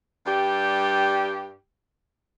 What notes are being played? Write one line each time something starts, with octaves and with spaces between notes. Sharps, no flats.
G2 G3 G4